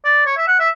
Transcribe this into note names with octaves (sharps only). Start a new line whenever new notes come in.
D5
C#5
E5
F#5
E5